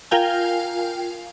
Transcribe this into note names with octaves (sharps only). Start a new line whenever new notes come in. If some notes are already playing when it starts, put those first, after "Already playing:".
F4 A#4 F5 G5 G#5